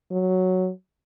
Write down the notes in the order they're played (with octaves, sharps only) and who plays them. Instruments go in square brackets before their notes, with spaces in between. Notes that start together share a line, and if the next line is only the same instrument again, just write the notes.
[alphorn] F#3